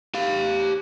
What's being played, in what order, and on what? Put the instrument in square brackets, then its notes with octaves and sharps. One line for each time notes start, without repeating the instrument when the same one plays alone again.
[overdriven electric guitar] G4 F5